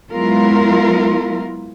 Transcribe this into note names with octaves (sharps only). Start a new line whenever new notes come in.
F#3 G#3 B3 E4 F4 A#4